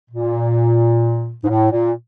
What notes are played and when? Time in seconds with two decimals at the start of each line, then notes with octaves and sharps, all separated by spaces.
0.10 A#2
1.44 G#2
1.49 A2
1.71 A#2